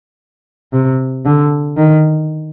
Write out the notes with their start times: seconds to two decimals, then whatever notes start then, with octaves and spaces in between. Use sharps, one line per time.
0.73 C3
1.25 D3
1.77 D#3